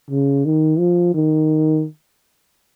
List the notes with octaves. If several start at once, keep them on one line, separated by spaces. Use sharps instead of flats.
C#3
D#3
F3
D#3